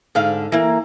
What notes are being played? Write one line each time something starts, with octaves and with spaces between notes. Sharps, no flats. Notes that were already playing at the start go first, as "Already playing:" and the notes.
G#2 D3 F5
E3 A#3